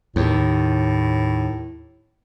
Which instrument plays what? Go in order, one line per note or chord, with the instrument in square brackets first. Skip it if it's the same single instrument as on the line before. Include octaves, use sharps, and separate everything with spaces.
[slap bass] D#2 [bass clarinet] A2